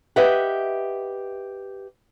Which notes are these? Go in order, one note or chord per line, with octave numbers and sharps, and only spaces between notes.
G4 B4 D#5 E5 F#5